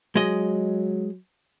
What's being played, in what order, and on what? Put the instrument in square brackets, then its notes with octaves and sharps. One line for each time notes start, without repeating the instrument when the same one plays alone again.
[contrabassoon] F#3 [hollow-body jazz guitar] G#3 D#5